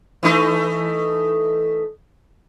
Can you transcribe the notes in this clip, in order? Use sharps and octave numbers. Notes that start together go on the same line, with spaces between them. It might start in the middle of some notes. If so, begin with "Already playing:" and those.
E3 A3 D#4